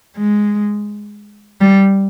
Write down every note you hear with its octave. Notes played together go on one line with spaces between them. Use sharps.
G#3
G3